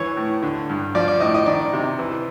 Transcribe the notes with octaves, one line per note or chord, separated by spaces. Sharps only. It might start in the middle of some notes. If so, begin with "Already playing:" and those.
Already playing: G#2 E3 C#5
A2
D3
G2
F3 D5
D5
A2 D#5
D#5
D#3 D5
C3
E3